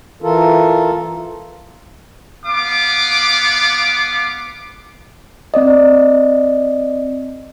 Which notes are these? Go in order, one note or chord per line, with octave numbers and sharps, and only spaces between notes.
E3 F4 A4 A#4
B3 F5 D6
C4 D5 D#5